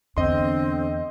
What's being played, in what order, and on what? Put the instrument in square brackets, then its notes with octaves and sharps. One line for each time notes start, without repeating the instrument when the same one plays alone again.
[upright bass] E2 [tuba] D3 [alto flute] C4 [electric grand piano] D#5 C6